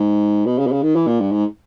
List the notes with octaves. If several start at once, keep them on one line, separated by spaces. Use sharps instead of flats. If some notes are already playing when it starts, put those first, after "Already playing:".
Already playing: G#2
B2
C#3
B2
C#3
D#3
E3
A#2
G2
G#2